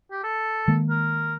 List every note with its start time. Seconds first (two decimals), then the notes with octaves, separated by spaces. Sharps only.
0.11 G4
0.24 A4
0.68 D#3 G#3 A#3
0.90 A#4